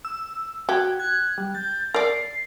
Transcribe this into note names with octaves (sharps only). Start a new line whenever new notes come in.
E6
F#4 G4 G#6
F#6 G#6
G3
G6 A6
A#4 D5 C7